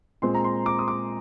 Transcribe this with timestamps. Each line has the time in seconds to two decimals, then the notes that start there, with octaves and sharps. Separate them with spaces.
0.22 A#2 G#3 C4 C6
0.35 A#5
0.44 C6
0.66 D6
0.79 D#6
0.88 D6